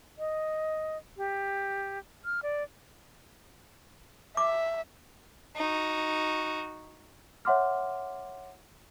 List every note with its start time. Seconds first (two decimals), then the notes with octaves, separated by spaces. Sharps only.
0.19 D#5
1.17 G4
2.25 F6
2.43 D5
4.37 E5 D6
5.56 D#4 F#4
7.45 C#5 E5 F#5 C6 D6 F6